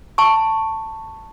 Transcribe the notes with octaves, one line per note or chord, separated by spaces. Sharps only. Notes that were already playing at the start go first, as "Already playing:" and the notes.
A5 C#6